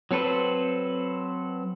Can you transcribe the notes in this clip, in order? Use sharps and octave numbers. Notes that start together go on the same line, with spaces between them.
F#3 C4 A4 B4 C5